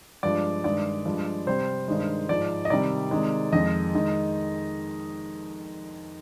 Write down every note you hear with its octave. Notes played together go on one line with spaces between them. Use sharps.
G2 F3 G#3 D5
G2 D#3 G#3 D5
G2 F3 G#3
C3 G3 C5
G2 D#3 G#3
G#2 F3 G#3 D5
D#5
C3 D#3 G3 D5
C3 D#3 G#3
F2 D#3 G#3 D#5
D#3 G#3